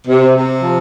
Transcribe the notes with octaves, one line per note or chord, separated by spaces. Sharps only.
C3
C3
F3